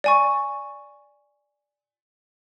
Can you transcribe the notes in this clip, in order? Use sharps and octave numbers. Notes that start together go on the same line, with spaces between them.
D5 G#5 C#6